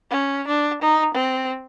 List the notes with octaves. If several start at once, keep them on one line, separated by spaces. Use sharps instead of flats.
C#4
D4
D#4
C4